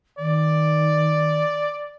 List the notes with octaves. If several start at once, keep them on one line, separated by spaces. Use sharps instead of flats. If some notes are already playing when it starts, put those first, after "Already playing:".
D#3 D5